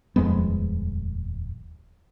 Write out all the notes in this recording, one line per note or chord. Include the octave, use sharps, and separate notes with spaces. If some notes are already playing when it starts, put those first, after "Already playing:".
D#1 F2 G#3 B3